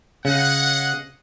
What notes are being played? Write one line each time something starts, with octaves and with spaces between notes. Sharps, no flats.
C#3 G#4 D#5 F#5